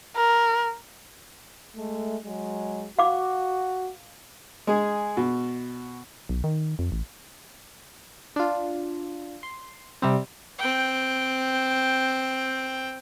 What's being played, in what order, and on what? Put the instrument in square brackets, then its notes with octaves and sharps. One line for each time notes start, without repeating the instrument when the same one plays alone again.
[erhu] A#4
[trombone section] G#3 A3
F#3 G#3
[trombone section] F#4 [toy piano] F5 D6
[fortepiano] G#3 G#4
B2
[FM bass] B1
D#3
F2
A1
[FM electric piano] D4 F4
C6
C3 G3 C4
[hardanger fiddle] C4 G5